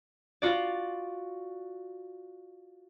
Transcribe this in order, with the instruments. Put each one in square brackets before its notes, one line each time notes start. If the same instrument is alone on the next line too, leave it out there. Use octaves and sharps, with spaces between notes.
[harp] F4 F#4 D5